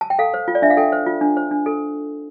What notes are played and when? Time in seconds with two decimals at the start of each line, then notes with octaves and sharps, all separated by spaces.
0.01 A5
0.10 G5
0.19 A4 F5
0.34 C5
0.48 F4
0.55 D5
0.62 D4 E5
0.70 F5
0.77 A4 G5
0.92 C5
1.06 F4
1.21 D4
1.37 C5
1.51 D4
1.66 A4